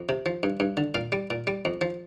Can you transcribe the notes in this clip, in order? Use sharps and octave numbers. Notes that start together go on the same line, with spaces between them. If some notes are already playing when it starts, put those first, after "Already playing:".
Already playing: F2
C3
F3
G2
G2
D3
A#2 F5
G3
A#2
G3
F2
F3